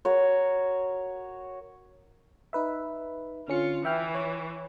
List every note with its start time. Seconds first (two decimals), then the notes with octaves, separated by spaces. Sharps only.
0.05 F#4 A#4 C#5
2.53 D#4 B4 E5
3.48 D3 C#4 F4 C#7
3.85 E3 E5 G5 F6
4.15 C#5